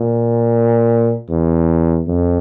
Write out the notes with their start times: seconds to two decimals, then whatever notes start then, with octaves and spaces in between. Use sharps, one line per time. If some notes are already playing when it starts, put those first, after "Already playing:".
Already playing: A#2
1.29 E2
2.08 F2